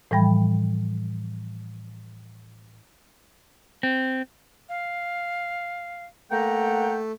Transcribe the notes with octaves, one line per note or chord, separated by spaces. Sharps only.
A2 E3 F3 G3 G5 B5
C4
F5
A3 A#3 F#5 G5 A#5